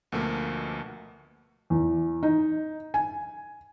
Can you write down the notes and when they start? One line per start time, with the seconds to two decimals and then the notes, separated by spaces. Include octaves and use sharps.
0.12 D2 B2 F3 A3 A#3
1.70 E2
2.23 D#4
2.94 G#5